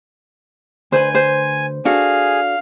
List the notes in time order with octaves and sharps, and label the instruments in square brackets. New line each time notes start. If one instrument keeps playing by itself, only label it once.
[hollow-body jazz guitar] D2 B4 [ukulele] C5 [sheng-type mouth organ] G#5
[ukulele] C5
[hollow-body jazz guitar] D4 F#4 A4 [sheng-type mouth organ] G#4 [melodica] F5